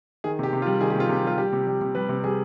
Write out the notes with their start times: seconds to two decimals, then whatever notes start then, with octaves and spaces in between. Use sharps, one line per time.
0.24 D#3 G#4
0.39 C3 G4
0.53 C3
0.62 F4
0.66 G3
0.81 D#3 G#4
0.90 G4
0.96 C3
1.00 F4
1.09 C3 G4
1.25 G3 F4
1.38 G3 G4
1.53 C3
1.67 G3
1.81 C3
1.95 G3 B4
2.09 C3
2.24 G3 G#4